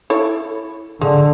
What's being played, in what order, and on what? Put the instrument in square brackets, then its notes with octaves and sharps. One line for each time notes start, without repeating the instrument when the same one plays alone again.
[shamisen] E4 A4 C#5
[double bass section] D3 [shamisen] G#3